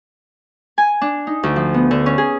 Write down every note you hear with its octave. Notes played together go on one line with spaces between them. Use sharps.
G#5
D4
D#4
D2
F3
B3
D3
C#4
G#4